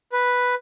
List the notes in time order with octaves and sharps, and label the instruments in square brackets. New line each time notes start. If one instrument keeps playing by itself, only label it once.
[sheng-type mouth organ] B4